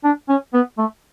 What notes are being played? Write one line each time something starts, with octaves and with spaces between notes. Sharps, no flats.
D4
C#4
B3
A3